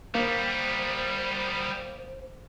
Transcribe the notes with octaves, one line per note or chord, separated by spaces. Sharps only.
G3 A#3 B3 C5